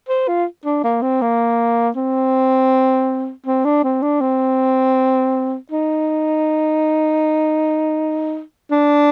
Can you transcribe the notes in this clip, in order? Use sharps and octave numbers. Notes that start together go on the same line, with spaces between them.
C5
F4
D4
A#3
C4
A#3
C4
C4
D4
C4
D4
C4
D#4
D4